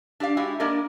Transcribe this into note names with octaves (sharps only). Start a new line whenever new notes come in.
D4 G4 D5 F5
G#3 D4 E4 F#4 G4
A#3 D4 A#4 D5 D#5